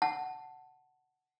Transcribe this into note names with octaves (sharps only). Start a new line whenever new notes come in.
F#5 A5